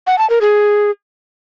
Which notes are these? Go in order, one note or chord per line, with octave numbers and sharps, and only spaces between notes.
F#5
A5
A#4
G#4